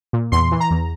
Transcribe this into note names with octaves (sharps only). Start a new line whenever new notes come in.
A#2
E2 C6
E3
A#5
E2